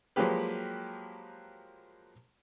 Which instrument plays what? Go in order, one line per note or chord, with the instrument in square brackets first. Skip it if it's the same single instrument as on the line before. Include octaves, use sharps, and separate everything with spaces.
[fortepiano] F3 F#3 G#3 A#3 G4 B4